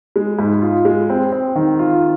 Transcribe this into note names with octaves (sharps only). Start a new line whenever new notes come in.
G#3
G#2
F4
G#3
C4
C4
D#3
F4